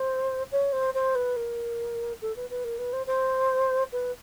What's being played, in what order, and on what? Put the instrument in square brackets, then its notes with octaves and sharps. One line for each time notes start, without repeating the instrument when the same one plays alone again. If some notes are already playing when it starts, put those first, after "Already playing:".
Already playing: [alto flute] C5
C#5
C5
C5
B4
A#4
A4
B4
B4
A#4
B4
C5
C5
B4